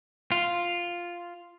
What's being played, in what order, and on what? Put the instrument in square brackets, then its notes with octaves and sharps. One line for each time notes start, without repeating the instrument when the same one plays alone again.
[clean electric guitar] F4